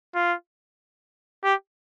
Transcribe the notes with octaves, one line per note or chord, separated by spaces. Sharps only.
F4
G4